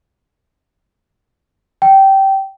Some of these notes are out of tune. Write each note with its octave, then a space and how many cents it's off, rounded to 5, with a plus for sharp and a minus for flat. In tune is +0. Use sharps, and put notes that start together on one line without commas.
G5 -15